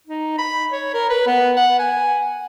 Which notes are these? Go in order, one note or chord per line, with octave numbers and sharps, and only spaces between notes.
D#4
B5
C#5
A#4
B4
B3
F#5
G#5